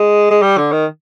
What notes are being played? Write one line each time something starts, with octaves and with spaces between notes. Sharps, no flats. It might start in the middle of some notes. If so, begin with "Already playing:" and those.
Already playing: G#3
G#3
G3
D3
D#3